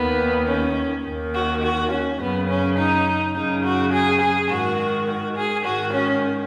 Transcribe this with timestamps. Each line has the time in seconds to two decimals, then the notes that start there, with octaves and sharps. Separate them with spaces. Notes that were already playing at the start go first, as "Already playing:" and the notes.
Already playing: D#2 D#3 B3
0.47 C#4
1.05 D#2 D#3
1.34 F#4
1.63 F#4
1.91 C#4
2.20 F#2 C#3 B3
2.49 C#4
2.77 D#4
3.35 F#2 C#3 D#4
3.64 F#4
3.93 G#4
4.21 G#4
4.50 G#2 D#3 F#4
5.08 F#4
5.36 G#4
5.65 G#2 D#3 F#4
5.93 C#4